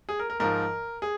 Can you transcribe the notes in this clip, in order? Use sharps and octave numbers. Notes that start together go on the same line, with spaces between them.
G#4
A#4
A#4
G#2 F3 A#4
G#4